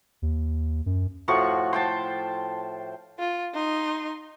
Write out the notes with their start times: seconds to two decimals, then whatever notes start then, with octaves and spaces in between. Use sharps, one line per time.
0.22 D#2
0.86 F#2
1.28 A2 F3 F#4 C#6
1.73 C5 G5 A5
3.19 F4
3.54 D#4 C6